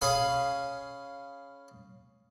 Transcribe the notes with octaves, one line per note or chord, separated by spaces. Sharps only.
C#4 G#4 F5 B5